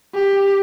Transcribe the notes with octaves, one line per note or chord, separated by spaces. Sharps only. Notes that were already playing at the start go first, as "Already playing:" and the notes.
G4